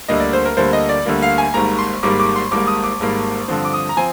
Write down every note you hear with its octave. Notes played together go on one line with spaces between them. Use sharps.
D2 D3 G3 A#3 D#5
D5
C5
A#4
D2 D3 G3 A#3 C5
D#5
D5
D2 D3 G3 A#3
F5
G#5
G#1 G#2 G3 A#3 A#5
C6
G#1 G#2 G3 A#3 D6
D6
C6
G#1 G#2 G3 A#3 D6
D#6
D6
G#1 G#2 G3 A#3
G2 D3 F3 C4
D6
D#6
A#5
F3 C4 G#5